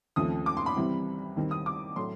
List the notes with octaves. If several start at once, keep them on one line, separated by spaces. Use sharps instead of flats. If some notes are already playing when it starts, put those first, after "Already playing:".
D#2 C#3 F3 A3 C4 D#6
D6
C6
B5
C2 C3 E3 G3 C4
D#2 D#3 G3 C4
D#6
D6
A2 F#3 A3 C6